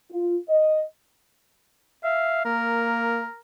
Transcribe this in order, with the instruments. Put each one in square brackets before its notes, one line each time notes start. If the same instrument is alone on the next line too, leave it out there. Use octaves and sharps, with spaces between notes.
[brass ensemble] F4
D#5
[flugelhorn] E5 [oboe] F5
[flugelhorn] A#3 [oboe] A#4